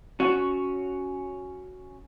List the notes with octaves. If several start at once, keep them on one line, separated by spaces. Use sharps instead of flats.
C#4 F#4